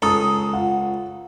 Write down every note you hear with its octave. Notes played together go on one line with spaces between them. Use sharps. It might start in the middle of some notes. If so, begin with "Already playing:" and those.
C#2 A4 A#5 D#6
F4 F#5